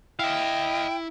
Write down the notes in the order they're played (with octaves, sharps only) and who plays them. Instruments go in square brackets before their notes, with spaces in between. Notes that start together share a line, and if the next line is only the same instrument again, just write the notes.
[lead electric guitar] E4 [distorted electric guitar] D#5 F5 [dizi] G5